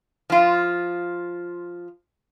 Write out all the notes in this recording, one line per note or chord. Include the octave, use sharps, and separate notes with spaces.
F3 F4